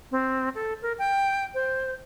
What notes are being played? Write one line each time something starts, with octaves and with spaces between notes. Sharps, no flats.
C4
A4
A#4
G5
C5